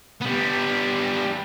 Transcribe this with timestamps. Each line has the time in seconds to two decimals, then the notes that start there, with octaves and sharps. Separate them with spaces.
0.21 G3 B3